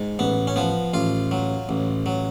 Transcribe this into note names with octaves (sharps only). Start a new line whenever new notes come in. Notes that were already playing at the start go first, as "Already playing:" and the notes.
Already playing: G#2
A1 B3
C#4
F3 B3
A1 F4
F#3
A1
F#3